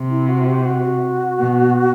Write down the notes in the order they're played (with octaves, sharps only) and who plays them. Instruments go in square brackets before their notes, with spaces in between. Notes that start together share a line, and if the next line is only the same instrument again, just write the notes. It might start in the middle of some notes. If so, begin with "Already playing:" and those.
Already playing: [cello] C3
[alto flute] E4
F#4
G4
F#4
[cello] B2